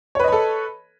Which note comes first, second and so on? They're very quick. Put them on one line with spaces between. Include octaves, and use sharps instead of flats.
C#5 B4 D#5 B5 A4